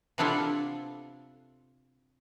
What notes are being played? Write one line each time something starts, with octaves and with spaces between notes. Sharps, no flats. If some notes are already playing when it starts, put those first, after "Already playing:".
C3 B3 D4 E4 F4 A4